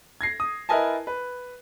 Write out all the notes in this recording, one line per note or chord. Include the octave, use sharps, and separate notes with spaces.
G#6 A#6 C7
D#6
E4 A#4 B4 D#5 G#5 A5
B4